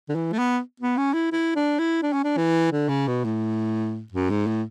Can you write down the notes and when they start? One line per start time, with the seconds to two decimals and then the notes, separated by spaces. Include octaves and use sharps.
0.09 D3
0.15 E3
0.33 A3
0.38 B3
0.80 B3
0.97 C#4
1.14 E4
1.32 E4
1.55 D4
1.79 E4
2.02 D4
2.13 C#4
2.23 D4
2.37 E3
2.72 D3
2.89 C#3
3.07 B2
3.24 A2
4.12 F#2
4.29 G#2
4.47 A2